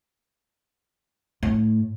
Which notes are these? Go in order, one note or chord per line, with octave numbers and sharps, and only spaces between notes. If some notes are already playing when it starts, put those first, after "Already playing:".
A2